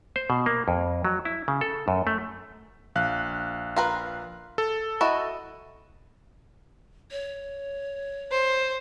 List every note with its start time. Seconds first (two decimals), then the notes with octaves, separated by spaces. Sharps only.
0.16 C5
0.30 B2
0.46 A#3
0.68 F2
1.05 F#3
1.25 E4
1.48 C#3
1.61 A4
1.88 F#2
2.07 A3
2.95 A#1 F5 F#6
3.76 F4 A#4 B4
4.58 A4
5.01 E4 F#4 D#5
7.11 C#5
8.31 C5